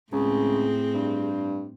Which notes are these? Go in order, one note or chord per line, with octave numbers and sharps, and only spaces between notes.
C#2 A2 C4 G#4
G2